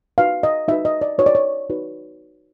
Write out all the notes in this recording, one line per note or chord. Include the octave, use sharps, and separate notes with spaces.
D#4 F#4 B4 F5
D#5
D#4 F#4 B4 E5
D#5
D5
D#4 F#4 B4 C#5
D5
C#5
D#4 F#4 B4